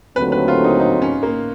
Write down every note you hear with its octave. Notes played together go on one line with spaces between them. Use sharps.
D#2 D3 F#3 A3 C4 B4
B4
F4
D#4
D#4
C#4
A#3